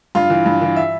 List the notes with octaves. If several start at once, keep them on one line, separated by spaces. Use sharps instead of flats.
G2 F4
E3
G2
E3
E5